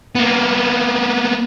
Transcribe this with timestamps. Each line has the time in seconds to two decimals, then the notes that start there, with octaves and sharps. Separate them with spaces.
0.15 A#3 B3